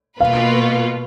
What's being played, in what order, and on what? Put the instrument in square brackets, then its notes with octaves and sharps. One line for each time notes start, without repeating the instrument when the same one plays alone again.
[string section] B2 A#3 F4 B4 [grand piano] F5